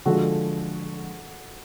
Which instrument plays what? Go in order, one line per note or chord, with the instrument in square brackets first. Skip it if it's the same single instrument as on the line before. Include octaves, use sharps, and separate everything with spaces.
[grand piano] D3 F3 G#3 [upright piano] F#4 A4